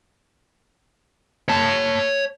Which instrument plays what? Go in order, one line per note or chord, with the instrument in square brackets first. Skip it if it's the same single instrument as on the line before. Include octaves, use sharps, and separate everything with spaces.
[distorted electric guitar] C#5 A5